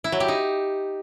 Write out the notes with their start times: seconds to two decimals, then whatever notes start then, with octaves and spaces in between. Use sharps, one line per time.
0.04 E4
0.12 F#3
0.20 G4
0.28 D#4